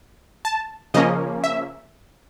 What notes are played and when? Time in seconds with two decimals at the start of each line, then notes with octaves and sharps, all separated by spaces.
0.45 A5
0.94 C#3 F3 A#3 C#4 D#5
1.44 E5